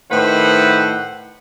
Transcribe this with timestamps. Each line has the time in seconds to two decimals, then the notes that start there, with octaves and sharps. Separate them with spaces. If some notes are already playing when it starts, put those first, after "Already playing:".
0.11 A2 D#3 A3 B4 C5 F#5